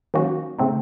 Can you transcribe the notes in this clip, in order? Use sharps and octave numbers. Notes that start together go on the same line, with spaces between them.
D#3 F#3 A#3 C#4 F#4
C#3 A3 C4 D#4